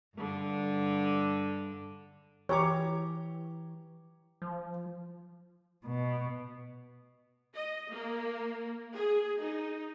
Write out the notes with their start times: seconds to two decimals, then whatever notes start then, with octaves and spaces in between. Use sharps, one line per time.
0.16 G2 D3
2.49 E3 G4 C#5 A#5 D6
4.42 F3
5.86 B2
7.55 D#5
7.91 A#3
8.94 G#4
9.41 D#4